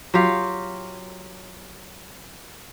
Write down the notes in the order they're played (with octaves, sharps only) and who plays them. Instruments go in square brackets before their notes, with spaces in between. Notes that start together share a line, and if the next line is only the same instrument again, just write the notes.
[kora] F#3 F4 G4 F5